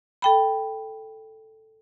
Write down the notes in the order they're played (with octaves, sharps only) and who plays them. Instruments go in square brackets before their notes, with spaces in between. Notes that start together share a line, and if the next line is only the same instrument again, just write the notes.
[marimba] A4 G5 B5